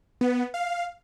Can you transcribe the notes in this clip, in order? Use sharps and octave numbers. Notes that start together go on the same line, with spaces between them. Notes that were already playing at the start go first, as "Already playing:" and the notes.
B3
F5